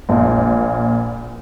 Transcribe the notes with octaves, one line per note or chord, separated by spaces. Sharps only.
A#1 A#2